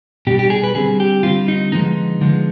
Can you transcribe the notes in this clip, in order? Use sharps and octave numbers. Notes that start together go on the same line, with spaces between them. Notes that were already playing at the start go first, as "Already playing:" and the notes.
B2 G3 D4 G4
G4
G#4
B4
D3 G3 C4 G#4
G4
D3 G3 C4 F4
D#4
D3 F3 G#3 B3 D#4
D3 F3 G#3 B3